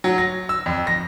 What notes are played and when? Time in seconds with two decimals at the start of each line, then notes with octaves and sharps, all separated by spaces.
0.04 F#3
0.18 A#6
0.49 E6
0.66 F2
0.87 A#6